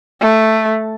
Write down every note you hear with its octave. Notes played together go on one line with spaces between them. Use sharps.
A3